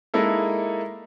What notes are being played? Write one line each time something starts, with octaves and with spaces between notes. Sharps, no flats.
G#3 A#3 D#4 E4 A4